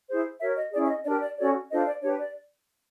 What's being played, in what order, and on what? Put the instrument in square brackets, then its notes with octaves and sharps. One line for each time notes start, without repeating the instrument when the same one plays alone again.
[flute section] E4 G#4 C5
F#4 A#4 C#5 E5
D#5
C#4 E4 G#4 D5
E5
D#5
D4 G4 A#4 D5
D5
C#4 F#4 A4 C#5 D5
D4 F4 A4 C5 D#5
D5
D4 G4 B4 C#5
D5